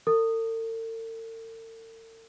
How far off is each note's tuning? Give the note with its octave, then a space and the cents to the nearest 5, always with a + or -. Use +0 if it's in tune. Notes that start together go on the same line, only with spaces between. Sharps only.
A4 +45